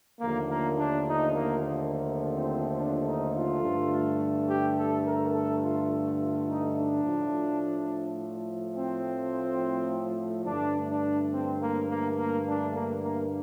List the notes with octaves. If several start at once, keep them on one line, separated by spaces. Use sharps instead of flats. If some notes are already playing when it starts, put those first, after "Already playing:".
D#2 D3 F3 A3 A#3
A#3
D4
D#4
A#3
A#3
A#3
C4
D4
D#4
F4
G2 D3 A3
G4
A4
A#4
A4
F4
A4
F4
D#4
D4
A2 F3 A3
C4
G2 D3 A3 D4
D4
C4
A#3
A#3
A#3
D4
A#3
A#3